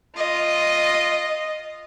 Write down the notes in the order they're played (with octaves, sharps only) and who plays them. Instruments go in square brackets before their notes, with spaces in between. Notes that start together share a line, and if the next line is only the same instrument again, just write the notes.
[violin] F4 D#5